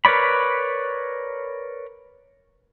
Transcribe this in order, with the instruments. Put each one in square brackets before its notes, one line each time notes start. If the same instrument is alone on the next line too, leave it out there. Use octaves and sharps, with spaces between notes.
[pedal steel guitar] A#4 B4 C#5 D5 B5